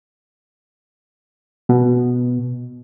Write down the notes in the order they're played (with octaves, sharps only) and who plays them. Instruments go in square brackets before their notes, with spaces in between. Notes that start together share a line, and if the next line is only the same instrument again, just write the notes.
[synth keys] B2